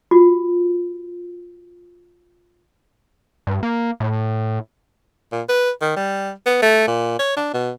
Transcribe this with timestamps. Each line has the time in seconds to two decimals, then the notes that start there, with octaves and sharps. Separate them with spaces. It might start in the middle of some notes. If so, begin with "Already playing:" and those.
0.11 F4 F#4
3.47 G2
3.63 A#3
4.00 A2
5.32 A#2
5.49 B4
5.81 D#3
5.96 G3
6.46 B3
6.62 A3
6.88 A#2
7.19 C#5
7.37 D4
7.54 B2